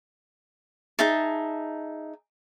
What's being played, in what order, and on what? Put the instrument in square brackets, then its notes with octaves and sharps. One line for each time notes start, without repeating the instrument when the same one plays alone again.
[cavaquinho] D#4 G#4 E5 A5